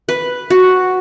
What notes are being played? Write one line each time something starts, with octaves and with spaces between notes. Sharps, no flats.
B4
F#4